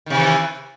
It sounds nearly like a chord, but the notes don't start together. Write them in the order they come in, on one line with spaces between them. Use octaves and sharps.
D#3 C3 E3